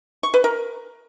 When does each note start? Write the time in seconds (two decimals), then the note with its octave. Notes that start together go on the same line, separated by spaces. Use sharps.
0.23 C#6
0.34 B4
0.44 A#4